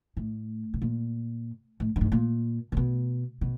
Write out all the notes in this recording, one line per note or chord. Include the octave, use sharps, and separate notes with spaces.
A2
B2
A#2
A2
G2
G#2
A#2
A#2
B2
B2